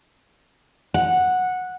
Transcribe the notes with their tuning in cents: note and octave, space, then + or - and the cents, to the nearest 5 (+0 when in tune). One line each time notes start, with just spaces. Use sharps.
F#5 -10